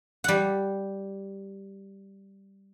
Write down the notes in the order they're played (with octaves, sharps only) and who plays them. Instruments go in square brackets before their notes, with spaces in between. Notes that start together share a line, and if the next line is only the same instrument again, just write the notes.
[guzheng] G3 F#5